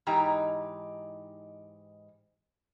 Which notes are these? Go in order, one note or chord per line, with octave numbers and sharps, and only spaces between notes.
G#2 E3 D#4 G4 A#5